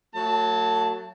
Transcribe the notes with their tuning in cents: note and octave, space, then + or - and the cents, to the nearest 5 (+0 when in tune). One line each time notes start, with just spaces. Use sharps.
F#3 +0 A3 +40 A5 +0